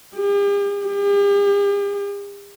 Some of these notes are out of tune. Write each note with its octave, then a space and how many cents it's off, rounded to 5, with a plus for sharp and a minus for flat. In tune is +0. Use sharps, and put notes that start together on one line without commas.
G4 +45
G4 +45